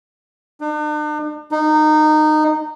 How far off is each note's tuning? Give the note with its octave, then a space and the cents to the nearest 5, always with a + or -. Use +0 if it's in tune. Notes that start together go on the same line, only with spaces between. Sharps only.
D4 +45
D#4 -20